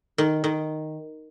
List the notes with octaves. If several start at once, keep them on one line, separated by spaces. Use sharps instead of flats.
D#3
D#3